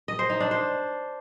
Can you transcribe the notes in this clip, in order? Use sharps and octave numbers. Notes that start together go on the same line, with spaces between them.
D#5
C5
D#4
D4
C5